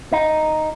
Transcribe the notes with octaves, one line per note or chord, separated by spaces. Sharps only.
D#4